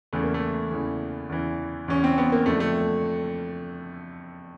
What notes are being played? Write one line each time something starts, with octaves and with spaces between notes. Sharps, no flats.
E2 C#3 E3 A3
A#3
A3
E2 C#3 E3
E2 C#3 E3
E2 C#3 E3 C#4
C4
B3
A#3
F2 D3 A3
A3